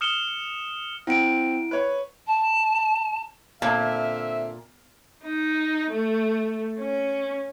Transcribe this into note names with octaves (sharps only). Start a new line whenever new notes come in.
D#6 F6 C#7 E7 G7
C4 E4 F#5 D7
B4 C#5
A5
A#2 D3 C4 E5 F5 A5
D#4
A3
C#4